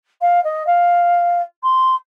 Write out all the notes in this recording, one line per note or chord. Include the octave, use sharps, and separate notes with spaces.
F5
D#5
F5
C6